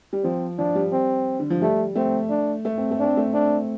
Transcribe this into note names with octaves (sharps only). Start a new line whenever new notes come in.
G3
F3 C4
F3 D4
G3
C4
D3
F3
G3 A3
A3 C4
D4
A3
C4
A3
C4 D4
A3
C4 D4